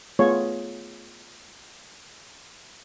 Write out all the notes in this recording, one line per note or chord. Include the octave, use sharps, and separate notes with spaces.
A3 B3 F4 G#4 C#5